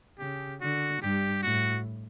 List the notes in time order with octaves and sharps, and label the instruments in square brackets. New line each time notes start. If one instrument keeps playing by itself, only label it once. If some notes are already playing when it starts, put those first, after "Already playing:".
[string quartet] C#3 [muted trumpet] G4
[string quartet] D3 [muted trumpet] F#4
[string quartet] G2 [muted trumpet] G4
[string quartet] A2 [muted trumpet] F#4